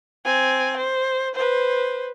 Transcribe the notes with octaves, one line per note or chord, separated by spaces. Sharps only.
C4 G#5
C5
B4 C5